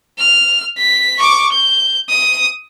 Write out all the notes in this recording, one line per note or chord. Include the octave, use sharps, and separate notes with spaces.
F6
B6
C#6 D6
G6
D#6